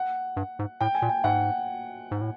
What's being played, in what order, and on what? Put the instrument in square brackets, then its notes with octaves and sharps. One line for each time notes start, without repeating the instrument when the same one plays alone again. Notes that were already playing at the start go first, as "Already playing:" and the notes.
Already playing: [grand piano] F#5
[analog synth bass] G2
G#2
[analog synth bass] A2 [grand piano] G5
[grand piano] G#5
[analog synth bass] A#2
[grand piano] G5
[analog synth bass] G#2 [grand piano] F#5
[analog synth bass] G#2
A2